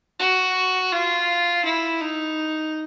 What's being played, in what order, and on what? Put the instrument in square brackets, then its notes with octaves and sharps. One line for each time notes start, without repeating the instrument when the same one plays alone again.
[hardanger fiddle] F#4
F4
E4
D#4